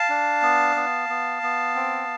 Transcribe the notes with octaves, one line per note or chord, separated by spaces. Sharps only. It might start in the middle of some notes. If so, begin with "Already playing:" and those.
Already playing: F5 A5
D4
B3
B3
B3
B3
C4